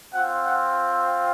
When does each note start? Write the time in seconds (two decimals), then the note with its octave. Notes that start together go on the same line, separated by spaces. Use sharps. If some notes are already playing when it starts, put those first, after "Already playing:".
0.12 C4 F4 F#5
0.44 F#5